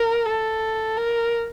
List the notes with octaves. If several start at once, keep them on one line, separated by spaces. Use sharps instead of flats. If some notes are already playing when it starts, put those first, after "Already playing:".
Already playing: A#4
A4
A#4